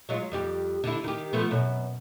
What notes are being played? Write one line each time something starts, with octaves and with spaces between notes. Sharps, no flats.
F#3 G#3 F4
F2 G3 G4
D3 E4
D#3 G4
F3 A3 B3
F#2 B2